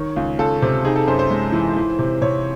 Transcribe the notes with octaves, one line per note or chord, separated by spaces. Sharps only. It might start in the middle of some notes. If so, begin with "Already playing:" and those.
Already playing: D#3 C#5
C#2
C#2 A4
C3
D#4 G#4
A4
F#2 C5
C5
G#3
E3
E3
C3
C3 C#5